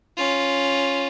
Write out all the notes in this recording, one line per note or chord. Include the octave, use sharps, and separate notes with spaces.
C#4 F4